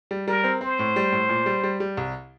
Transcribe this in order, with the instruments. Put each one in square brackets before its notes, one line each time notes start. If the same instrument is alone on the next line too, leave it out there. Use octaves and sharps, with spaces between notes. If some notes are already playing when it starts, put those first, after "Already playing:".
[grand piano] G3
[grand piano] G3 [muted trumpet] A#4
[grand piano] C4
[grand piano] C4 [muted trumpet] C5
[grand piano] A2
G3
A2
A#2
G3
G3
G3
C2